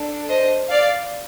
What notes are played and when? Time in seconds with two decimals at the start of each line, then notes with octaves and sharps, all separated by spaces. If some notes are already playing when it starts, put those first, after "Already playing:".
Already playing: D4 A4
0.28 C5 D#5
0.70 D5 F5